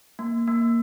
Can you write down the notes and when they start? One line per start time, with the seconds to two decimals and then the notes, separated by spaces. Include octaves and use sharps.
0.19 A#3
0.47 A#3